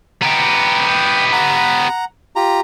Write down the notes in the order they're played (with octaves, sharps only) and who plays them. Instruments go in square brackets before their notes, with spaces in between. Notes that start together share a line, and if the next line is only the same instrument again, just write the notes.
[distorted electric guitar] B3 G4 [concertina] A#5
[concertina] G5
F#5 A#5
F4 G4 A#5